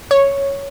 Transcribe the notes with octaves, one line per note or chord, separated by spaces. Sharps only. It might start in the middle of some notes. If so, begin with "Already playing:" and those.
C#5